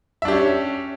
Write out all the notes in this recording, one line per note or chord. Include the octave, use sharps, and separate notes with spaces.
C#4 D4 G4 E5